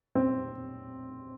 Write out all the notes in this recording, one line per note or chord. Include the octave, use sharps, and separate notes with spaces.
C4